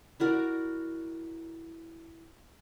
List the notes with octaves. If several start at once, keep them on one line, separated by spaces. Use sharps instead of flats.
E4 F#4 A#4 D5